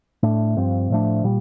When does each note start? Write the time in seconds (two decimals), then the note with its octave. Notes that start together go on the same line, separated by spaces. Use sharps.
0.23 A2 A3 D4
0.57 G2 F3 C4
0.90 A2 F3 A3 D4
1.24 A#2 G3